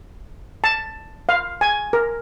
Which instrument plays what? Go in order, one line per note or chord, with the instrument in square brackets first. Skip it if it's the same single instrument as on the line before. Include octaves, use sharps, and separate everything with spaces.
[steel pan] A5
F5
G#5
A#4